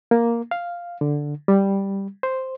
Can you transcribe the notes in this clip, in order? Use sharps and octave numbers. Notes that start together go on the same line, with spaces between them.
A#3
F5
D3
G3
C5